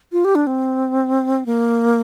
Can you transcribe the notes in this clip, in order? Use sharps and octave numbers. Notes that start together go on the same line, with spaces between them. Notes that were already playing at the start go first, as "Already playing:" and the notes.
F4
G4
D4
C4
A#3